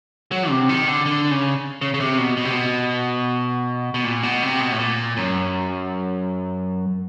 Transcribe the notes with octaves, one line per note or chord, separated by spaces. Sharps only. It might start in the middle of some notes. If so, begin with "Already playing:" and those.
F#3
C3
D#3
D3
D3
C#3
C#3
C#3
C3
B2
B2
C3
B2
B2
A#2
B2
C3
B2
A2
A#2
F#2